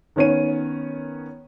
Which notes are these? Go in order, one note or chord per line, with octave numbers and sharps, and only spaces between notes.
D#3 B3 C#4 C#5 D#7